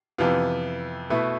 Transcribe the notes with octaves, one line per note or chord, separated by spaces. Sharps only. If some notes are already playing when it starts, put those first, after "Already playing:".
F2 C3 E3 B3 F4
B2 A3 E4 B4